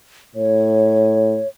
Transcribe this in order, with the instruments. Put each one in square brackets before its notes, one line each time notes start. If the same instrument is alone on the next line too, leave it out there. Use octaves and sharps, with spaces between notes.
[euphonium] A2 [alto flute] C#5